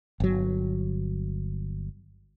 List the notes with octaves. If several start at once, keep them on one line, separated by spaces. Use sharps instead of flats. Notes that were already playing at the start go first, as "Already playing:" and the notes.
G1 F#3